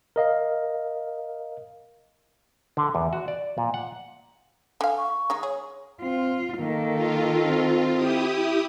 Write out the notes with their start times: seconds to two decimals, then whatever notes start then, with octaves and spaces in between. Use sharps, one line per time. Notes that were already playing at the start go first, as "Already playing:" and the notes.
0.16 A#4 D#5 F5
2.77 D3
2.95 E2
3.13 F#4
3.28 D5
3.58 A#2
3.74 F#5
4.81 D3 F5 G#5
4.98 C#6
5.30 D#3 G#3 D#4
5.43 G#4 C#5
6.02 C4 F4
6.59 D#3 A#3 A4
6.94 F4
7.46 C4
7.93 E4 G4 D#6